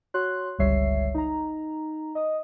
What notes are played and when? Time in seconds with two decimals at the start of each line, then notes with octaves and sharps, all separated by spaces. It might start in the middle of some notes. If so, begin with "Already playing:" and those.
0.14 F#4 C#5 C6 F#6
0.58 G1 C#2 G3 C#5 E5 C7
1.14 D#4 A#5
2.15 D#5 D#6